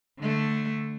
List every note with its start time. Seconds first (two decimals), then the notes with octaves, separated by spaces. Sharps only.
0.19 D3 A3